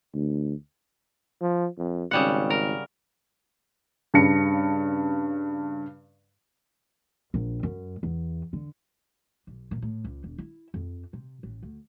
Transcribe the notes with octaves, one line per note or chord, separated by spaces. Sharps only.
D2
F3
F2
G#1 C#3 G3 F#5
A#4
G2 C#3 A5 A#6 C#7
A#1
F#2
E2
D3
B1
A#2
A2
C#2
E1
E4
F2
C3
A1
D2